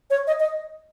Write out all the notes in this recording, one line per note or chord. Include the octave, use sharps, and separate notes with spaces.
C#5
D#5
D#5